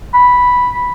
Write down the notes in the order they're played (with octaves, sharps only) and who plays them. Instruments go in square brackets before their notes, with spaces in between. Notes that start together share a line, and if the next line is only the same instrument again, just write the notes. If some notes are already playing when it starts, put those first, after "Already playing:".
[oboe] B5